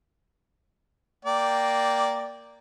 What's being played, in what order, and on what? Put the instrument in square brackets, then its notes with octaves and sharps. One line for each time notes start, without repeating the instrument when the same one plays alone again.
[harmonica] A#3 D5 G5